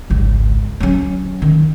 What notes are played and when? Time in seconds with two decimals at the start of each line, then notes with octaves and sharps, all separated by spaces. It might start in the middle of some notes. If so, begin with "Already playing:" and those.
0.10 G#1 C#2
0.80 F#3 C#4
1.42 D#3